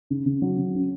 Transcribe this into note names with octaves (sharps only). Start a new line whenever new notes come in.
C#3
C#3
F#3
C#3
C#4